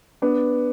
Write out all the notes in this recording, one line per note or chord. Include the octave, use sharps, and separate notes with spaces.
B3 D4